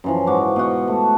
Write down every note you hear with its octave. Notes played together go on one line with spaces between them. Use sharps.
F#2 E3 F3
G#2 F#4 D6
B2 F#4
A3